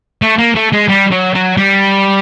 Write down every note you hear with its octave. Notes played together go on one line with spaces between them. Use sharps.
A3
A#3
A3
G#3
G3
F#3
F#3
G3